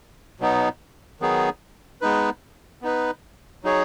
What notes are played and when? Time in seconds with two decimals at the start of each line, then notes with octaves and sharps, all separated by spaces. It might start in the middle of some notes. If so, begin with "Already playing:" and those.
0.40 B2 F#3 B3 D#4
1.20 D#3 F#3 B3 D#4 G#4
2.01 G#3 B3 D#4 B4
2.82 B3 D#4 B4
3.64 F#3 D#4 G#4 C#5